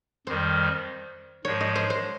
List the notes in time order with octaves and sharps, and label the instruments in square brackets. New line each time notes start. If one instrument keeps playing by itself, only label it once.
[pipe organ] F2 D#3 G3 [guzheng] C5
[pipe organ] G#2 F3 G#3 [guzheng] C#5
[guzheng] D#5
C5
C5